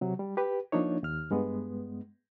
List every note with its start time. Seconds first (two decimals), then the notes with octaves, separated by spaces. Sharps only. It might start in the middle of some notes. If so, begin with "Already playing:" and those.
0.01 C3 F#3
0.19 G3
0.37 G4 B4
0.72 F3 A#3 D4 D#4 C#5
1.03 D#2 F6
1.31 G2 G#3 B3